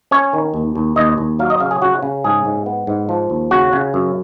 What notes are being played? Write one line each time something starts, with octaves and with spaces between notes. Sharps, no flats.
C#4 C#5
D#3
D#2
D#2
D#2 D#5
D#2
F#3 F5
D#5
C#3 F5
G#4
C#3 F#4
C#3
G#2 G#4
G#2
B3
G#2
F3
D#2
C#3 F#4
C#3
F#2